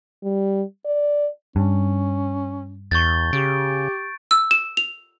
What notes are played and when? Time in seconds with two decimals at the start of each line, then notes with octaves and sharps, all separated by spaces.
0.23 G3
0.85 D5
1.56 G2 C#4
2.91 E2 C#6 G6 A6
3.33 C#3 G4 D7
4.31 E6
4.51 E7
4.77 F7